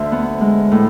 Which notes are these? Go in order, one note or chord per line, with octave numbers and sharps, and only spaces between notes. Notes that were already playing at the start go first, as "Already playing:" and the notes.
Already playing: D2 C5 E5
B3
G#3
A2